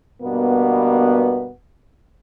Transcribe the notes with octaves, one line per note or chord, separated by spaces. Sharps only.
G2 B2 A#3 B3